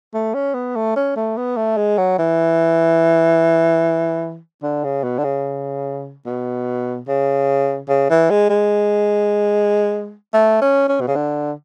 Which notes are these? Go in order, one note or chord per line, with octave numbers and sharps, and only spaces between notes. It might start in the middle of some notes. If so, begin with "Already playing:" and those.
A3
C#4
B3
A3
C#4
A3
B3
A3
G#3
F#3
E3
D3
C#3
B2
D3
C#3
B2
C#3
C#3
E3
G#3
G#3
A3
C#4
C#4
B2
C#3
D3